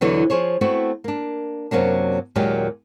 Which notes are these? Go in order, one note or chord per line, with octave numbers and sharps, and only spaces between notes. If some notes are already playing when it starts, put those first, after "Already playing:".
E2 B2 D3 E3 F#3
F3 G#4 C5 C#5
A3 B3 C4 E4 F#4
A#3 D4
F#2 C3 F#3 A#3 D4
D#2 A#2 F#3 G#3 G4